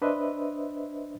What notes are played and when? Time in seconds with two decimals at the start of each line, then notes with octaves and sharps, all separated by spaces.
0.02 D4 B4 C5 D#5 E5